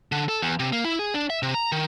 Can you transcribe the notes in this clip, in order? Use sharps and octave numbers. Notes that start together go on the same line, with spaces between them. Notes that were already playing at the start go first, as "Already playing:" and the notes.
D3
A4
E2
C3
A#3
E4
G#4
D4
E5
C3
A#5
D#3